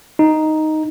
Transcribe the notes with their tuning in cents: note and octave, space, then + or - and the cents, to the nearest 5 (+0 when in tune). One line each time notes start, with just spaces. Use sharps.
D#4 +0